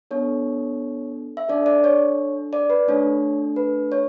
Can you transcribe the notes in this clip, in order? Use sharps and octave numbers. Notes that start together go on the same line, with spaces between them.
B3 D4 A4 C#5
E5
D4 A4 D5
D5
C#5
D5
B4
A3 D4 A4 C#5
B4
C#5